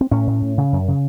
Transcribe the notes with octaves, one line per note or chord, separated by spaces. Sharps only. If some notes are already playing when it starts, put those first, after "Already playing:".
C4
A2 C#4
A2
A2
C#3
F#2
C#3